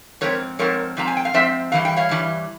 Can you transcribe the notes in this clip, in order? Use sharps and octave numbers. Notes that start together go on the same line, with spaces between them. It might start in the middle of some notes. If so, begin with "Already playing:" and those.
G#2 F3 C4 A#4 C#5
G#2 F3 C4 A#4 C#5
G#2 F3 C4 A#5
G#5
G5
F5
G#2 F3 C4 C5 E5
G2 E3 G3 F5
G5
C#5 F5
G2 E3 G3